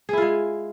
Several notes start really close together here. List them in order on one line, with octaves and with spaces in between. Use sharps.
G#4 E4 F4 G#3